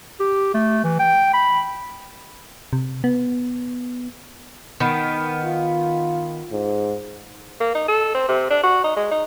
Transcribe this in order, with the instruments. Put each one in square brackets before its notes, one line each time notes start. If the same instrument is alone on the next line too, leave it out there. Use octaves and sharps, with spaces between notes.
[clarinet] G4
A3
E3
G5
B5
[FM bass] C3
B3
[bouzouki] D#3 B3
[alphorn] F4
G#2
[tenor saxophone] A#3
D#4
A4
C4
C3
D4
F#4
D#4
G#3
D#4